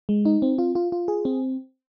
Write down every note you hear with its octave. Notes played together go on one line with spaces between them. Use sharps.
G#3
D#4
C4
F4
F4
F4
G#4
C4